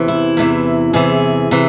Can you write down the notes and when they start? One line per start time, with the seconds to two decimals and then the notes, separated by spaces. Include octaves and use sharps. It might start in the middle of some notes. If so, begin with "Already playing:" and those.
Already playing: E2 C3 E3
0.08 E4
0.37 E2 C3 E3
0.93 E2 C3 E3 G#4
1.51 C3 E3